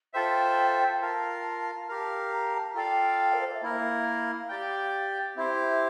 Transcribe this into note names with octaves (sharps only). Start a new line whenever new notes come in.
F4 A4 C5 E5 G5
F4 A#4 F5 A5
G4 A#4 F5
A#5
A5
F4 A4 D5 F5 G5
A#4
C5
D5
E5
A#3 E4 A#4 F5
G4 D5 G5
C4 E4 G4 C5 E5